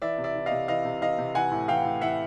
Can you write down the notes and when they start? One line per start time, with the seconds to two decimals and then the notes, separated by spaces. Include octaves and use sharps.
0.02 E3 D5 E5
0.18 C3
0.24 D5 E5
0.35 E3
0.46 D#5 F5
0.52 C3
0.68 E3 D#5 F5
0.85 C3
1.02 E3 D#5 F5
1.18 C3
1.35 E3 F#5 G#5
1.51 A2
1.68 E3 F5 G5
1.85 A2
2.01 E3 E5 F#5